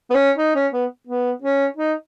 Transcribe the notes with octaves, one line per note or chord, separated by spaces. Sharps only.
B3
C#4
D#4
C#4
B3
B3
C#4
D#4